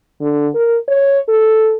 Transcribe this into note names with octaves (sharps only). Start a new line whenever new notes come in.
D3
A#4
C#5
A4